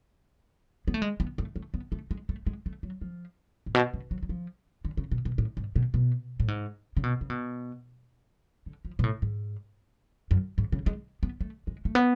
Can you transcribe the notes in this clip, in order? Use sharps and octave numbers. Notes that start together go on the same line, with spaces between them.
B3
A3
G#3
B3
A3
A3
B3
A3
G#3
A3
G#3
A3
F#3
F3
A2
B2
C#3
F#3
F#3
F3
D3
C#3
B2
B2
A2
G#2
B2
B2
A2
G#2
C#3
B2
C#3
B2
D3
F3
B2
A2
G#2
F#2
G#2
C#3
G#3
B3
A3
G#3
A3
B3